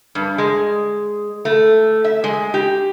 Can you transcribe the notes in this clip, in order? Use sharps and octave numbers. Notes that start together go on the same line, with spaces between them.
G2
G#3
A3
E5
G#3
G4